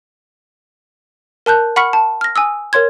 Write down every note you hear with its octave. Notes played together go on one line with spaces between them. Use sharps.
A#4 A5 F#6 G6
F#5 B5 C#6 F6 B6 C#7
A5
F6 A#6
G#5 D#6 E6
A#4 C#5 C6 G#6